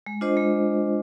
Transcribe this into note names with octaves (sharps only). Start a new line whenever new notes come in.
G#3
D4 F4 C5 D#5
G#3